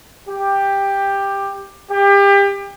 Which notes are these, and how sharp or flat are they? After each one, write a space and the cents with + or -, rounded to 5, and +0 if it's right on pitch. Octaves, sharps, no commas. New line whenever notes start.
G4 +10
G4 +30